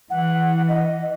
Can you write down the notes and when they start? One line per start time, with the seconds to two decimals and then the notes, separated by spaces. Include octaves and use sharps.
0.10 E3 F#5
0.68 D#5